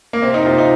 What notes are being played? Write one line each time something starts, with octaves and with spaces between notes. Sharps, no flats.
A#3
C3 C4
D#4
C3 F4
D#4